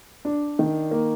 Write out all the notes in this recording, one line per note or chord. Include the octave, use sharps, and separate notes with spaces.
D4
D#3
A#3